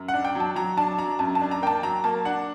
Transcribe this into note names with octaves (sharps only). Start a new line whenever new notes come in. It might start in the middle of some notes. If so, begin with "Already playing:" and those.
Already playing: F#2
F#5
D4
G5
F#3
A5
F#3 A#5
D4 A5
F#3 A#5
F#2 A5
A5
D4
A#5
A#3 G5
A5
F#3 A#5
A#3 A5
D4 F#5